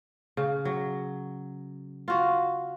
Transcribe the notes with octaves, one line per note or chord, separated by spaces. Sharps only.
C#3
F#3
F4 F#4